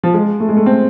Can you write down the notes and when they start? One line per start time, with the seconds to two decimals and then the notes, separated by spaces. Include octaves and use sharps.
0.03 F3
0.14 G#3
0.40 A3
0.49 G#3
0.57 A3
0.66 C4